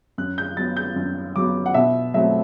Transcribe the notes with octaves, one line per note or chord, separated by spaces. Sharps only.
F#2 F#6
G6
F#3 B3 A6
G6
F#2
F#3 B3 D6
F#5
B2 E5
F#3 A3 C4 E5